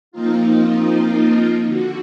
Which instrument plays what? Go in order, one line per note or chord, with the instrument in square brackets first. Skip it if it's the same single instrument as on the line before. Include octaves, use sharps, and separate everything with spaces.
[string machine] F3 A#3 C4 D#4 F4
D3 F#4